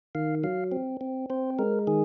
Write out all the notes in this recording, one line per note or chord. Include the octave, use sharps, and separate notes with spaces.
D#3 F5
F#3 F5
C4
C4
C4 C5
G#3 A#4
D#3 G#4